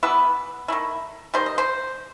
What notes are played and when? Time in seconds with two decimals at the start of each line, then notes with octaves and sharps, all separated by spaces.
0.03 E3 G3 B3 E4 B4
0.68 D#3 A3 E4
1.34 D#3 G3 D#4 C5
1.46 D#5
1.58 C5